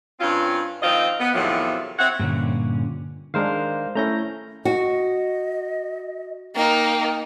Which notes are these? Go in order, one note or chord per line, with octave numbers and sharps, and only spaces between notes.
G2 C4 C#4 F4
D#3 F3 C4 F4 D#5
B3
E2 A2 C3 D#3 F3 F#3
C4 C#5 E5 F#5
G2 A#2 D3 C#4
D#3 G#3 D4 A#4 C5 F5
A3 C#4 E4 A#5 G6 A#6
F#4 D#5
A#3 D#4 G5